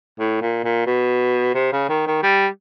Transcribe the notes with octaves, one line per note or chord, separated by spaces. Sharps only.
A2
A#2
A#2
B2
C3
C#3
D#3
D#3
G3